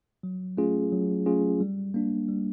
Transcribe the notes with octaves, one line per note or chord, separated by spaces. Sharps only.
F#3
A3 C#4 F4 G#4
F#3
A3 C#4 F4 G#4
G3
A#3 D4
G3